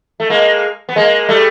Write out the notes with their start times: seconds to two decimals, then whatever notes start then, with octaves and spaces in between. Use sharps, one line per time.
0.20 A3
0.30 G#3 A#3
0.89 B3
0.96 G#3 A#3
1.29 G3 A3